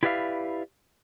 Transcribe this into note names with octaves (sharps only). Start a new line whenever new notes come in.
E4 G4 B4 D5 E5 F5